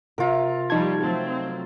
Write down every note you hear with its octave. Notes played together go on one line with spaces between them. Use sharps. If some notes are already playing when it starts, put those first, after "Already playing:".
C3 F4 A#4 E5
F3 G3 D#4 A5 C#6 G#6
F#3 A3 C4 A6